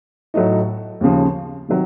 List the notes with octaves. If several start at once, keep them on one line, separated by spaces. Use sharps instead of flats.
A2 F#3 A3 D#4
D#2 C#3 F3
C3 D#3 F#3